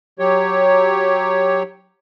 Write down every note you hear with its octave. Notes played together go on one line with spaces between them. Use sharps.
F#3 G4 C#5